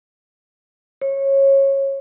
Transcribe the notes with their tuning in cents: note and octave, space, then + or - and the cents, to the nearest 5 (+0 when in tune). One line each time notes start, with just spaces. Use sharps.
C#5 -20